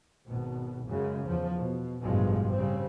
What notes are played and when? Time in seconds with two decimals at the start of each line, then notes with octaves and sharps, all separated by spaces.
0.27 G#1 B2
0.87 F#2 C#3 G#3
1.26 E2 F3
1.57 B2
2.02 A1 G2 B2 F3 G#3
2.52 C#3 G3 C4